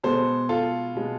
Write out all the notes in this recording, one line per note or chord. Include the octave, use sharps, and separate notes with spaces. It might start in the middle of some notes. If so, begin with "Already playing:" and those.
B2 G#3 B3 A4 C5
F4 A4
B2 G#3 B3